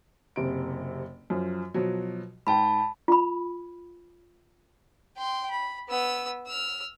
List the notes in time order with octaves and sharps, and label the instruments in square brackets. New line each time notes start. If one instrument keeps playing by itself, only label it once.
[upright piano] F#1 C3 D7
F#2 F3
B2 F3 F#3
[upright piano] G#2 G5 [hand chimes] A5 B5
[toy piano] F4 B5
[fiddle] G5 C6
B5
B3 E6
E6 F6